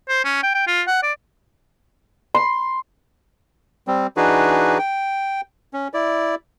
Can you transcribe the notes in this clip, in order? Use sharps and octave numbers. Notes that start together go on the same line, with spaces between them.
C5
C#4
G5
G5
F4
F#5
D5
C6
G3 C4
E3 D4 D#4 F#4 G#4 B4
G5
C#4
E4 D5